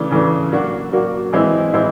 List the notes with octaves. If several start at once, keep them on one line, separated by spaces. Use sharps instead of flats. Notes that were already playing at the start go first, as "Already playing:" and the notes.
Already playing: C#3 E3 A3 D4
C#3 E3 A3 D4
F#3 A#3 D4 F#4
F#3 A#3 D4 F#4
E3 G#3 C4 E4
E3 G#3 C4 E4